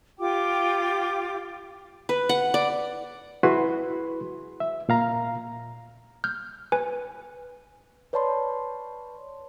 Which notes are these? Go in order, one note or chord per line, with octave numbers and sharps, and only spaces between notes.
F4 G4 G5 D6
B4
F#5
D5
E4 F#4 G#4 B4 B5 C6
E5
A#2 F5 A#5
F6 G6
B4 G#5
B4 C#5 D5 A5 B5 C6